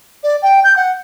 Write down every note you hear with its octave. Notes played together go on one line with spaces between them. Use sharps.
D5
G5
G6
F#5